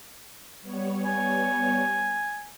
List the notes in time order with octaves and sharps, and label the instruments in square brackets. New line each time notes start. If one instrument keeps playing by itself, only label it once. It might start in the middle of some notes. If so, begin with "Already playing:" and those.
[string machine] G3 B3 C#5
[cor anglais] G#5